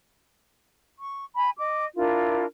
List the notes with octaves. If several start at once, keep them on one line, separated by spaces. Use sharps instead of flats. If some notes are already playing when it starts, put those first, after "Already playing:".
C#6
G#5 B5
D#5 D6
D4 E4 F4 A#4